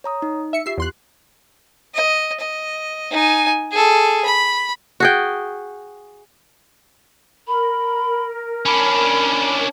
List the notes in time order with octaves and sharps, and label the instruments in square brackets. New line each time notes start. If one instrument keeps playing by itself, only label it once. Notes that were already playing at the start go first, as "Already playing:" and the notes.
[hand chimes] C#5 A#5 D#6
D#4
[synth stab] E5 C#7
[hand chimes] F4 G4 [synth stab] E5 C7
[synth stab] E2 C6 F#6
[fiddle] D#5
D#5
D#4 G#5
G#4 A4
B5
[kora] F#4 G#4 G5
[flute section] A#4 [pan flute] B5
[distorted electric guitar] C#4 D4 [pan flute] B5